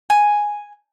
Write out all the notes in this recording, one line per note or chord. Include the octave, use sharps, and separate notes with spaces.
G#5